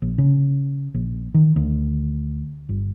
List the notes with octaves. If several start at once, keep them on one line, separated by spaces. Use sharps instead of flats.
A#1
C#3
A#1
D#3
D2
G1